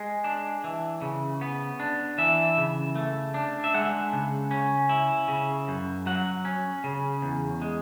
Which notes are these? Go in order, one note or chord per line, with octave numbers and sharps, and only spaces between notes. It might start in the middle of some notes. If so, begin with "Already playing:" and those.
Already playing: G#3
D4
E3
C#3
B3
D4
E3 E5
C#3
A3
D4
E5
G#3 F#5
C#3
C#4
E4
C#3
F#2
F#3 F#5
C#4
C#3
E2
G#3